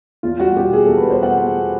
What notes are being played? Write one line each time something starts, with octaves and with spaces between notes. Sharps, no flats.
E2 F4
G3 F#4
B2 G4
E2 G#4
E2 A4
B4
G3
C5
B2 F#5
E2